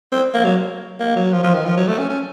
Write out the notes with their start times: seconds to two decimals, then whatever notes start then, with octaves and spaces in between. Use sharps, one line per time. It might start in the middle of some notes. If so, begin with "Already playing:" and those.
0.12 C4
0.34 A#3
0.45 F#3
1.00 A#3
1.16 F#3
1.33 F3
1.43 F3
1.54 D#3
1.65 F3
1.77 F#3
1.88 A3
1.99 C#4
2.09 C#4